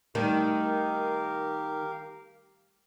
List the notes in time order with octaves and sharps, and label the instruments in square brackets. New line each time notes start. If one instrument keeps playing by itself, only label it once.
[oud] D#3 [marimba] G3 A3 [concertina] G4 A#4 F5